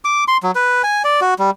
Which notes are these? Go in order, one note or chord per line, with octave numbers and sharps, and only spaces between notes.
D6
C6
F#3
B4
G#5
D5
F#4
G3